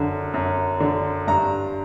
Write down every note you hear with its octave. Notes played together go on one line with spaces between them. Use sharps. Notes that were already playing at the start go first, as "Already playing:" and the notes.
Already playing: F#2 D3
F#2
D3
G2 A#5